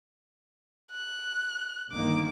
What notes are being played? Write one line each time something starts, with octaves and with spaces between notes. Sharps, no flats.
F#6
G1 D#3 A#3 D6